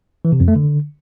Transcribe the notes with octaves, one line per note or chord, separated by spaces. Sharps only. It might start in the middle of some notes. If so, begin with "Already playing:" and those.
E3
C3
F2
A3
D3